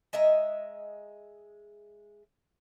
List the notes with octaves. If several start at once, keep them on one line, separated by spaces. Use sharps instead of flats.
G#3 D#5 E5 A#5